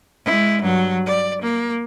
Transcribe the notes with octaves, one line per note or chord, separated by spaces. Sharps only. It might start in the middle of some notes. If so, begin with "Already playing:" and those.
G#3 E4
G2 F#3
D5
A#3